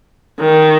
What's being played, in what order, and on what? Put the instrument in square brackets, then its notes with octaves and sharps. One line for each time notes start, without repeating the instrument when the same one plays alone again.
[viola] D#3